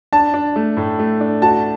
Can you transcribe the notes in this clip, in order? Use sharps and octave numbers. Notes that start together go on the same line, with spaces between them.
D4 A5
D4
A3
A2
A3
D4
F#4 A5